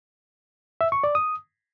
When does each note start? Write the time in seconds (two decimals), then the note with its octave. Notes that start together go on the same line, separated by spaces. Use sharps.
0.81 E5
0.92 C#6
1.04 D5
1.15 D#6